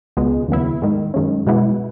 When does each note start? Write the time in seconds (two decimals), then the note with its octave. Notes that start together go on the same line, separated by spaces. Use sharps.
0.17 C#2 B2 G#3 B3
0.49 D#2 C#3 F#3 B3 E4
0.82 G#2 D#3 G#3
1.14 F#2 D#3 G#3 C#4
1.47 B2 G#3 B3 E4